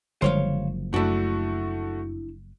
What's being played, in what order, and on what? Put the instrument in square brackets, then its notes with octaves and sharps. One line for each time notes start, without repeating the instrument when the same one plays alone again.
[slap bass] F#1 F3 [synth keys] D3 G3 G#3 [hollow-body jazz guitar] C5 C#5 F5
[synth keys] F#2 [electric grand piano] A3 F#4 [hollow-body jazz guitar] D4 E4